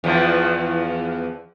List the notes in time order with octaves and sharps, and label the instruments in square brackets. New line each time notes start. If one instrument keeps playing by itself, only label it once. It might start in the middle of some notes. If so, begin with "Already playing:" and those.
[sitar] E2 E3 F3